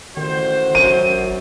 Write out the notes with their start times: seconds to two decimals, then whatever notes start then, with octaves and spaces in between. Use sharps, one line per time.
0.17 A1 D#3 F#4 C5
0.75 G#1 F#2 D#7